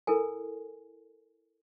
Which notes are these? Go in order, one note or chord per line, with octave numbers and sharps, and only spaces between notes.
E4 A4 A#4 G#5